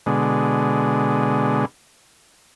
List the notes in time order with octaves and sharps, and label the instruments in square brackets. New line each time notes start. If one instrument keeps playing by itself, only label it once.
[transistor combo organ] B2 D3 G#3